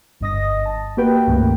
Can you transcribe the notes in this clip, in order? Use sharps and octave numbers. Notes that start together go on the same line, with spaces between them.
G1 G2 D#5 D#6 A#6
A5
A#3 F#4 G4 B4 G5
C#2 G2 D#3 A3 A#3